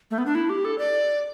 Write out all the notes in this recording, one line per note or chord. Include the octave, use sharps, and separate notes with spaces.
A3
B3
D4
E4
G4
A4
D5